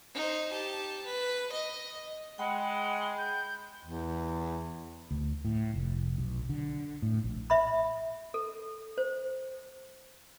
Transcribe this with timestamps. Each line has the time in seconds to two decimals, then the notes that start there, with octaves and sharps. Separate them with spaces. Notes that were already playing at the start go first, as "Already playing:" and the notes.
0.14 D#4 C5
0.51 G4 A5
1.06 B4
1.52 D#5
2.38 G#3 F#5 G5 B5
3.17 G6
3.85 E2
5.11 D2
5.45 A2
5.74 F1
6.18 B1
6.49 D3
7.02 A2
7.24 A#1
7.50 E5 B5
8.34 A4
8.98 C5